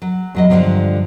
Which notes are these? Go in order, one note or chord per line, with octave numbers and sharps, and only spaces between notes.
F#3
E2 F#3 D#5
G2 B2 D3 F3 F#3